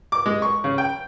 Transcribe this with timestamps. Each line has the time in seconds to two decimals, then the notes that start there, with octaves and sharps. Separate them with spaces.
0.12 D6
0.26 G#3
0.42 C#6
0.64 C#3
0.78 G5